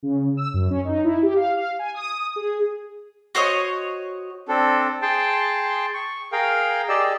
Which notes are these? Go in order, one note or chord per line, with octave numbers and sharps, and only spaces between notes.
C#3
E6
F#2
C#4
D#4
E4
G4
F5
F5
G#5
D#6
G#4
F#4 C5 C#5 D#5
C4 D4 A4
G#4 G5 A5 C6
C#6
G#4 A#4 F5 G5
G4 G#4 D5 D#5 E6